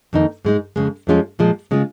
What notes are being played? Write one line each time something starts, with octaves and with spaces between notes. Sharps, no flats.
F2 D#3 A#3 D#4
G#2 G#3 D#4
F2 C#3 G#3
F2 F3 G#3 C#4 F4
A#2 F3 G#3
C#3 G#3 F4